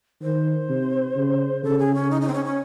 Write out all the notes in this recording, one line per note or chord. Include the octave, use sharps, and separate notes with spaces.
D#3 C5
C3
C#3
C#3 A4
G#4
C#4
D#4
D#4
C4
C#4
C#4